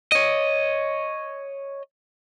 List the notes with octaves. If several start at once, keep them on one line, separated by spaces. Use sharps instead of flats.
C#5 D#5